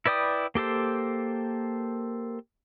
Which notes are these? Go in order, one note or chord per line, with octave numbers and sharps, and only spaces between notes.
E4 B4 D5 G5 D#6
A#3 G4 A4 C5